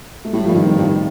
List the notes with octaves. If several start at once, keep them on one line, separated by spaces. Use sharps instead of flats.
A3
A2 G3
F3
G2
D#3
F2 A2
G2